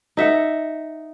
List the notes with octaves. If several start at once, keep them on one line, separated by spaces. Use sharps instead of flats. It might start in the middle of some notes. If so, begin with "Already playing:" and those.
D#4 E5 F#5